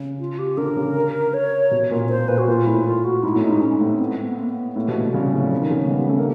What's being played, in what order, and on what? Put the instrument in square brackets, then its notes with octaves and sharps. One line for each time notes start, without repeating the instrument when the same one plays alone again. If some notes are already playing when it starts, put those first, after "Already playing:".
Already playing: [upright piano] C#3
[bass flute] F4
G4
[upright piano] D3 [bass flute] A#4
[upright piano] C#3
[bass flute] C#5
[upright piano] B2
A#2
[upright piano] A#2 [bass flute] C5
[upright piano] A#2 [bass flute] B4
[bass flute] F#4
[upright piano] A#2 [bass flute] F4
[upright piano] A2 [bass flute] E4
[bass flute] F4
F#4
[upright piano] G#2 [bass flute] E4
[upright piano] A2
[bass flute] D#4
[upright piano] G#2
[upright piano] G#2 [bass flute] C#4
[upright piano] A2 [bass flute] C4
[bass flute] B3
C4
B3
A#3
B3
[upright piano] A2 [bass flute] A#3
[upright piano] B2
[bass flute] A3
[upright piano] C3
[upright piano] C#3 [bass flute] G3
[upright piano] A2 [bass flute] F#3
[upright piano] C#3 [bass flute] F3
[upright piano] D#3
C#3
C#3
[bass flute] A#3
[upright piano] G3 [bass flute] B3
[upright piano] A3 [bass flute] C#4
[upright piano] A#3 [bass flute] D4